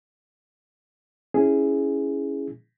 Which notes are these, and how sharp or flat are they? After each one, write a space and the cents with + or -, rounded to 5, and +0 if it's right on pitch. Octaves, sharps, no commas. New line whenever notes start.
C#4 +0 E4 -5 G#4 +0